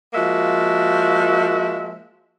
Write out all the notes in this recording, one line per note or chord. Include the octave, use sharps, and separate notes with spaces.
F3 G#3 A#3 F#4 E5